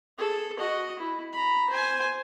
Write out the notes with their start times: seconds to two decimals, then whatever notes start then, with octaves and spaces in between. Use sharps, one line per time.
0.18 G#4 A4
0.59 F#4 D#5
0.99 E4
1.33 A#5 B5
1.70 C5 G#5